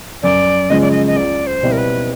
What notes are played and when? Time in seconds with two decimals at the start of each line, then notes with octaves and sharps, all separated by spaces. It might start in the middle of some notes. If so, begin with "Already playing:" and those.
0.23 F#2 D5
0.70 C#3 F3 G#3 D#5
0.81 D5
0.91 D#5
1.07 D#5
1.16 C#2 D5
1.47 C5
1.63 B2 G3 C4 E4
1.72 A#4
1.78 B4